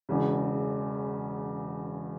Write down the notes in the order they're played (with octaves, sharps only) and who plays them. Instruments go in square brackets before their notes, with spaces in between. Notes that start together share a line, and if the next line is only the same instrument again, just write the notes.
[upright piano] E1 E2 C#3